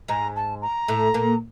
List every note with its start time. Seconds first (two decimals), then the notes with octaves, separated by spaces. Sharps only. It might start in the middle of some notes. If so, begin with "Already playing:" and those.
0.08 G#2 G#3 A#5
0.36 A5
0.61 A#5
0.88 A2 A3
1.14 A#2 A#3